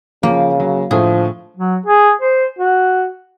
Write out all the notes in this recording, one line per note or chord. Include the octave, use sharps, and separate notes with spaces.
C#3 F3 A#3
F#3
A2 D3 F3 A3 G#4
F#3
G#4
C5
F#4